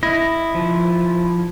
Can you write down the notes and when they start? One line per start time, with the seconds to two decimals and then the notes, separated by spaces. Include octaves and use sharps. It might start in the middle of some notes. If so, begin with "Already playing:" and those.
0.03 E4 D#5
0.55 F3